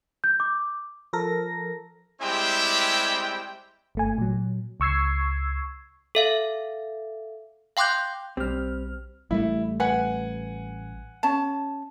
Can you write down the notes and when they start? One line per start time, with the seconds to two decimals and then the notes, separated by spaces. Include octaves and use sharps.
0.24 G6
0.40 D6
1.13 F3 A4 A#4 A#6
2.21 G3 G#3 C4 E4 G4 G5
3.95 G1 A3 G#5
4.18 A#2 F#3
4.80 C#2 C#6 E6 G#6 C7
6.15 A4 E5 F5
7.77 F5 G5 C6 D6 F#6 G6
8.37 B1 G3 C4 G4 F6
9.31 A1 G3 A3 E4
9.80 B4 F#5 G#5
11.23 C#4 A5